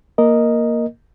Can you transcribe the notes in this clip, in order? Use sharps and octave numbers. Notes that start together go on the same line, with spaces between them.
A#3 A#4 D#5